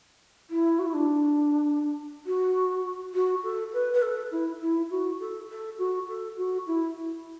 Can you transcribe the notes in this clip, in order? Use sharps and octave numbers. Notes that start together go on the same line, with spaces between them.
E4
F#4
E4
D4
F#4
F#4
A4
B4
B4
A4
E4
E4
F#4
A4
A4
F#4
A4
F#4
E4